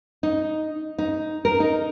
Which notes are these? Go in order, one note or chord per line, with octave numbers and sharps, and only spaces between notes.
D#4
D#4
A#4
D#4